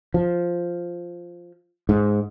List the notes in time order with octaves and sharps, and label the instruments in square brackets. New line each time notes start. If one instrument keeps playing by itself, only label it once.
[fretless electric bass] F3
G#2